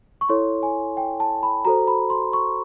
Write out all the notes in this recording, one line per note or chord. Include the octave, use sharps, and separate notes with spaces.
C#6
E4 A4 C#5 C6
G#5
G5
A5
B5
F#4 A4 C5 A#5
B5
C6
C#6